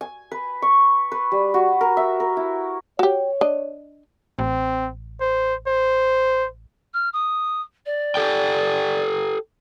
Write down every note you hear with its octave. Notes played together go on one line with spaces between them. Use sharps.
G#5
B4
C#6
B4
G3
F#4
A#4
E5
A#4
E4
F#4 G4 C#5
D4 D#5
A1 C4
C5
C5
F6
D#6
D5
G4 A4 G5